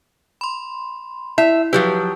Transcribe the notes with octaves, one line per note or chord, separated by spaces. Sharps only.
B5 C6
E4 E5
F3 F#3 G4 B4